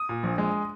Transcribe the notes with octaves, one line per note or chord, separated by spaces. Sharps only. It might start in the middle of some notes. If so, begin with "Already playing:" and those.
Already playing: D#6
A#2
A#1
G#3